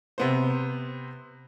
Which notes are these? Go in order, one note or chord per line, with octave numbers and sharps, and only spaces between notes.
C3 B3 C5